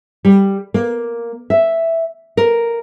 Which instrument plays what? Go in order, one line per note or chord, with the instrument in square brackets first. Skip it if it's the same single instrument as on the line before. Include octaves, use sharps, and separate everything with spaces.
[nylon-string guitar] G3
A#3
E5
A#4